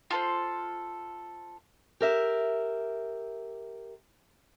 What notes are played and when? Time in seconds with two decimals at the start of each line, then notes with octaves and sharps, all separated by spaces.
0.11 F4 A4 B4 C5
2.00 G4 A#4 E5